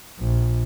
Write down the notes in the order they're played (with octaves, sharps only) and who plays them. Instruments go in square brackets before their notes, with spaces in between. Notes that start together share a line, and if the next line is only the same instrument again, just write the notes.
[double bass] A#1